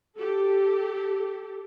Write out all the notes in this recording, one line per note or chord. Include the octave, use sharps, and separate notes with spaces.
G4 A4